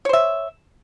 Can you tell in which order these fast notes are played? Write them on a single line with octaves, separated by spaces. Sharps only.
C#5 C5 E5